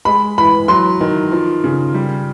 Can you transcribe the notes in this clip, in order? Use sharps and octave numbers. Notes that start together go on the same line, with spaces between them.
G#3 B5
E3 B5
F#3 C6
D#3
F3
C#3
G3